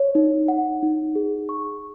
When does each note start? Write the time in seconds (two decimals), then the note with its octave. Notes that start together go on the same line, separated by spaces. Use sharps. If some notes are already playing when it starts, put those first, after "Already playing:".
Already playing: C#5
0.15 D#4
0.48 F#5
0.83 D#4
1.15 G#4
1.49 C#6